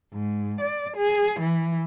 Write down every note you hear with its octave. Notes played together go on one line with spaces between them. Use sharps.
G#2
D5
G#4
E3